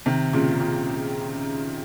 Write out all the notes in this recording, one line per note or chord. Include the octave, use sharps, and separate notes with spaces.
C3 D#3
A#2 C#3
A#2